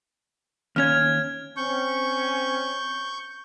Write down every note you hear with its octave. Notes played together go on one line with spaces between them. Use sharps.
D#2 C#4 F6 G#6
C4 C#4 C#6 G6